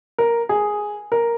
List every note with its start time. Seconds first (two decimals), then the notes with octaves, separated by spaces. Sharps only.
0.18 A#4
0.49 G#4
1.12 A#4